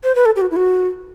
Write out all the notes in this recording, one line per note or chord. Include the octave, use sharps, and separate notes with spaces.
C5
B4
A4
G4
F#4
E4
F#4